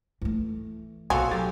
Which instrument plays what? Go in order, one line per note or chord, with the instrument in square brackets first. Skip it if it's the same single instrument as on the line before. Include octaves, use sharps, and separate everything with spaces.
[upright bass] E3 A3
[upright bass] B1 [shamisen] F3 G#5 [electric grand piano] F#4 A4
[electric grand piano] F#3 G4 A6 [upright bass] D#4